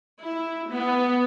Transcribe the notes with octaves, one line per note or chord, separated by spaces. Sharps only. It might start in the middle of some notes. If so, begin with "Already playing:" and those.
E4
B3